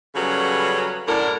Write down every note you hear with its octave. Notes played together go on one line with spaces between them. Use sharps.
C#3 F#3 G3 B3 C#4 A4
F#2 A2 D3 D4 A#4 D5